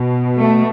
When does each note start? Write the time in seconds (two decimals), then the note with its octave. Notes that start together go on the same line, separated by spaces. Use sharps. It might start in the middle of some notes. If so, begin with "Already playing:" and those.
Already playing: B2
0.39 A3